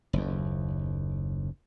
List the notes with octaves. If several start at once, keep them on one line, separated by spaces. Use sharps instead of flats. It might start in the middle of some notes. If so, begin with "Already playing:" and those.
F#1 D#2